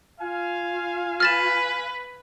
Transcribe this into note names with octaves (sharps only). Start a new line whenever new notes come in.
F4 F5 G#5
B4 F6 A6 E7